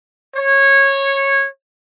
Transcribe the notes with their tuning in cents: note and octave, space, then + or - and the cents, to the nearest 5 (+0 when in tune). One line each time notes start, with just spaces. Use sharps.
C#5 -15